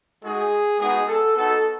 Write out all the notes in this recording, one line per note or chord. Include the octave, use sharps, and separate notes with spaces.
G#3 D#4 F#4 G#4
G#3 B3 D#4 F#4 G#4
A4
B3 D#4 F#4 A4